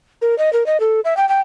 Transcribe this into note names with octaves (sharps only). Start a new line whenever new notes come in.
A#4
D#5
A#4
D#5
A4
E5
G5
G5